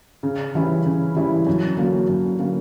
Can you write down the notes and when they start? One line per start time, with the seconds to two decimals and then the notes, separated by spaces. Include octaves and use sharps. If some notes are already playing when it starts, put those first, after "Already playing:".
0.23 C#3
0.55 E3 G3 C#4 E4
0.86 C#3
1.16 E3 G3 C#4 E4
1.47 F#2
1.77 D3 F#3 A#3 C#4
2.08 F#2
2.39 D3 F#3 A#3 C#4